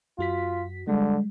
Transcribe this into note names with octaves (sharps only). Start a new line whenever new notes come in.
F#2 F4 F#4 B6
D3 G3 G#3